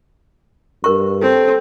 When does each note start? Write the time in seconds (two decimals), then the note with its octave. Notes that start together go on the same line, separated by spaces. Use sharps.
0.84 G2 A#4 C#6
1.22 C4 A4